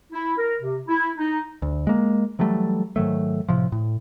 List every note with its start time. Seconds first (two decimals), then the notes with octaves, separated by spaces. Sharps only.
0.12 E4
0.38 A#4
0.61 C3
0.87 E4
1.17 D#4
1.62 D2
1.87 G#3 A#3
2.39 E3 F#3 G3 A3
2.96 G#2 D#3 F#3 A3
3.49 A2 C3 F3
3.72 A2